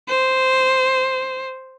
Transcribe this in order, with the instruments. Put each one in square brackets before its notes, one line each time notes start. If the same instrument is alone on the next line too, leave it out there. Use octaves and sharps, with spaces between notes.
[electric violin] C5